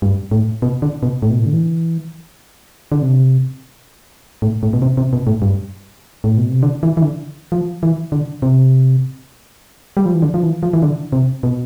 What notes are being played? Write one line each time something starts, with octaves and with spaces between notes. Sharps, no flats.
G2
A2
B2
D3
B2
A2
B2
A2
D3
E3
D3
C3
A2
A2
B2
C3
C3
B2
A2
G2
A2
B2
C3
D3
E3
E3
D3
F3
E3
D3
C3
G3
F3
E3
D3
F3
E3
F3
E3
D3
C3
B2